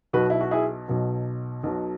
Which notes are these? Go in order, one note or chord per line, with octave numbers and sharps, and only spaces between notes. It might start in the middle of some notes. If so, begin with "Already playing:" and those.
B1 B2 F#3 F#4 B4
E4
F#4
E4 G#4
B1 B2 F#3
B1 B2 F#3